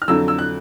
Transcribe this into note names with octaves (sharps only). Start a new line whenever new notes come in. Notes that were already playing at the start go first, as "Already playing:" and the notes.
F6
F2 D3 F#3 E6
E6
F#6